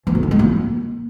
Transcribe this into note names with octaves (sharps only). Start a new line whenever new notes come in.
E3
D3
D#4
G#3
A#3